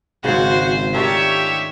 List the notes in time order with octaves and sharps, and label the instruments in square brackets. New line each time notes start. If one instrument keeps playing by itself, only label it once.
[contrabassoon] G#1 [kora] G#2 C#3 [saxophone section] G#3 F#4 [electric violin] C5
[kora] D#3 C#4 D4 [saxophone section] A3 F4 G4 [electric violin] C#5 E5